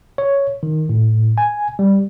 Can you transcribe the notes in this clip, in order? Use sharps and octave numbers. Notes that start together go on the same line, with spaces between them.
C#5
D#3
A2
G#5
G3